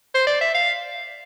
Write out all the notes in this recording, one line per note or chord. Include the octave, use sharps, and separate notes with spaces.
C5
D5
E5
F5